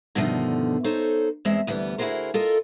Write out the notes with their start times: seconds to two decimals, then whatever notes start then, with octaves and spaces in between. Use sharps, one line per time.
0.15 G2 B2 D3 D#3 F3 A3
0.84 D#4 A4 C5 C#5
1.45 E2 G#3 C4 E5
1.67 D2 E3 G3 B3
1.98 D2 E4 F#4 G#4 A#4 C5
2.34 F4 A4 A#4 D#5